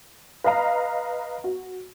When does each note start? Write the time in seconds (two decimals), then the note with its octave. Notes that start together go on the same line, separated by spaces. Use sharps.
0.44 B4 D#5 F5 A#5
1.44 F#4